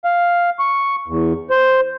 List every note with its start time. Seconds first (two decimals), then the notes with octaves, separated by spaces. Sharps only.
0.05 F5
0.59 C#6
1.08 E2
1.50 C5